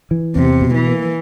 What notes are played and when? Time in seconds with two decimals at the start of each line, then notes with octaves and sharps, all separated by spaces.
0.11 E3
0.36 E2 C3
0.62 B2
0.75 E3
0.87 A#3